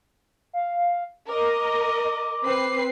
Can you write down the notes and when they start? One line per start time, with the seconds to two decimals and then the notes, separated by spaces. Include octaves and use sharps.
0.53 F5
1.29 A#4 D#5 D6
2.45 C4 B4 C7